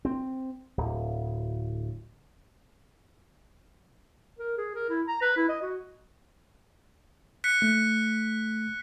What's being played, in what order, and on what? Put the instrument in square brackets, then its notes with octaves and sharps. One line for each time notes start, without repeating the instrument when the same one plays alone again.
[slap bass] C4
D1
[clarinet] A#4
G#4
A#4
E4
A#5
B4
E4
D#5
F#4
[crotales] F#6 B6 C#7
[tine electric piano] A3